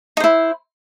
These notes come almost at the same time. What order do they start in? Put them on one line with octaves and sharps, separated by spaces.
D#4 C5 E4